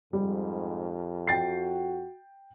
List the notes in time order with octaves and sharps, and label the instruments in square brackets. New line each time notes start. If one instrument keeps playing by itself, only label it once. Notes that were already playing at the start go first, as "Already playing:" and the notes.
[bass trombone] F2 [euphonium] G#2 [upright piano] G3
[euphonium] F#4 [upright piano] G5 A6 C7